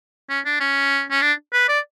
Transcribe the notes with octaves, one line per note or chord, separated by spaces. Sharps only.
C#4
D4
C#4
C#4
D4
B4
D5